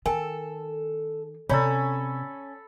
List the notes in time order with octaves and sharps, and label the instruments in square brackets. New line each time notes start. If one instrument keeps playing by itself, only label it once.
[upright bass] D#3 [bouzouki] A4 [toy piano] A#4 G5 G#5
[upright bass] C3 [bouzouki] C#4 [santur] A4 B5 [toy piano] C#5 D5 A#5